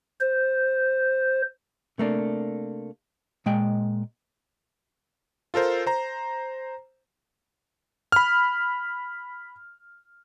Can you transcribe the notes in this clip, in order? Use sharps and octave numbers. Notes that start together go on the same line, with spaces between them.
C5
C3 A3 A#3 D4
A#2 G#3 D#5 G5
F4 A4 A#4 C5
C5 A#5
B5 F6